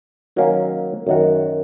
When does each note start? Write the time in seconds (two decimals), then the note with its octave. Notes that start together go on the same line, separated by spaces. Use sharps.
0.36 D#3 F#3 A#3 C#4
1.07 F#2 D#3 A#3 F#4